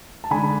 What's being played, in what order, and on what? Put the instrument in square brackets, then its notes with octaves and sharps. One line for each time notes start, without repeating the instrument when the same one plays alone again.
[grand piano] A5
D3 G#3 D4 G#5 B5